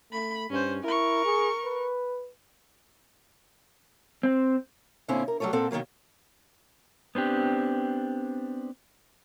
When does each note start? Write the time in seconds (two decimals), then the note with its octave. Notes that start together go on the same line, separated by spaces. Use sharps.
0.13 A3 B5
0.50 G2 C#4 C5
0.84 E4 A#4 C#6
1.25 G#4
1.64 B4
4.23 C4
5.08 A#2 D3 C4 C#4 E4
5.28 A#4
5.40 F#3 G3 A3 A4 C#5
5.53 A#2 C4 A4 F#5
5.71 B2 D#3 E3 F#3 A#3
7.15 B3 C4 D4 G4